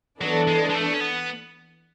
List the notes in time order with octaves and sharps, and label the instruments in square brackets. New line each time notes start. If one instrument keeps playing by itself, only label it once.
[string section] E3 B3 D4 A4 [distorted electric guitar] F#3
[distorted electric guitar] G#3
G#3
A3
C#4
B3